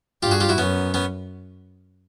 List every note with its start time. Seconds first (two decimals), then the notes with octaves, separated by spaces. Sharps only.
0.23 G2 F4 G4
0.31 F#4 G#4
0.40 F4 G4
0.49 E4 F#4
0.58 F#2 B3 C#4
0.94 B3 C#4